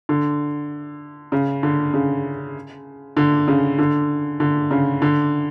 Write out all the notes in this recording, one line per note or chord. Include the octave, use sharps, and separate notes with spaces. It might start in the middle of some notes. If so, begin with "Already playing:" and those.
D3
C#3
D3
C#3
D3
C#3
D3
D3
C#3
D3